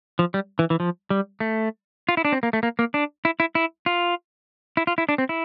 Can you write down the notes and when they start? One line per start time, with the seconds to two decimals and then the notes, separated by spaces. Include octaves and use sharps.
0.19 F3
0.34 G3
0.59 E3
0.70 E3
0.80 F3
1.10 G3
1.40 A3
2.09 F4
2.17 E4
2.25 D4
2.32 C4
2.43 A#3
2.53 A3
2.63 A#3
2.79 A#3
2.94 D4
3.25 E4
3.40 E4
3.55 E4
3.86 F4
4.77 E4
4.87 F4
4.98 E4
5.09 D4
5.18 C4
5.29 E4